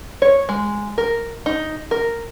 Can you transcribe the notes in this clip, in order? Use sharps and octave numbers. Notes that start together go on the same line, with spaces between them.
C#5
G#3
A#4
D#4
A#4